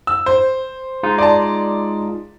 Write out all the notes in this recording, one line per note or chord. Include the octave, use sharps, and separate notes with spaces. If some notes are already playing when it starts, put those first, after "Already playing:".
E6
C5
G#3 D#4 F4
D5 A5